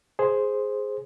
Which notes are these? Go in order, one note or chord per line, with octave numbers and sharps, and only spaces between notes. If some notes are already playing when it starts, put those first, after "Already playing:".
G#4 C5